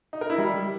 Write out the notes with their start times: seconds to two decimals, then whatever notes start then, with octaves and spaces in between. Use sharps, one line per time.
0.13 D#4
0.21 A#4
0.30 E4
0.38 G3